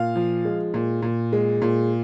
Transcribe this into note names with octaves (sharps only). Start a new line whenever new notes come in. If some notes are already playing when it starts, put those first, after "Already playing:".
Already playing: A#2 F5
F3
G#3
A#2
A#2
G#3
A#2